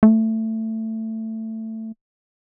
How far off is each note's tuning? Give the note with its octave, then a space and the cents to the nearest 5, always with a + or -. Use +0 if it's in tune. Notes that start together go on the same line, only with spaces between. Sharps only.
A3 +15